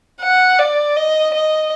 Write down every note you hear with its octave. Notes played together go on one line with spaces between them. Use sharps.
F#5
D5
D#5
D#5